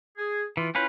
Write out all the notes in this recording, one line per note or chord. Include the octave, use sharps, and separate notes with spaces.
G#4
E3 F4
C#4 E4 F4 B4 C#5 G5